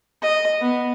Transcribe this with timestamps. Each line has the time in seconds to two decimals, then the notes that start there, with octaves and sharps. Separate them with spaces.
0.22 D#5
0.61 B3